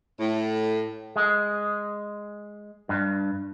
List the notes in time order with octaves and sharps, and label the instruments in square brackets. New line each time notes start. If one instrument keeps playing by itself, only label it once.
[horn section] A2
[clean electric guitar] G#3
G2